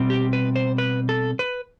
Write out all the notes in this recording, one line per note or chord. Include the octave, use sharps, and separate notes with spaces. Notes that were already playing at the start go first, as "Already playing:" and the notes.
Already playing: B2 G3 C4
G4
B4
C5
B4
A4
B4